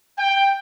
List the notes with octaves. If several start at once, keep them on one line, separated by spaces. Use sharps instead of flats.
G5